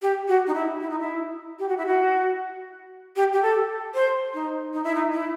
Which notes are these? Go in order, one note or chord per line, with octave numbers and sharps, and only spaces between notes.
G4
F#4
D#4
E4
E4
D#4
E4
G4
F#4
E4
F#4
G4
G4
A4
C5
D#4
D#4
E4
D#4
E4